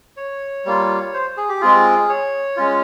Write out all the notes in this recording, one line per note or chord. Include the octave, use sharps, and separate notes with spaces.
C#5
G3 A#3 F4
C5
G#4
G4
G#3 C4 F4 G#4
C#5
G#3 C#4 F4